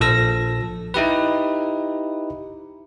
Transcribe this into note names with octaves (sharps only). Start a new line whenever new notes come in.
A#1 F3 A4 E6 A#6
D#4 E4 G4 B4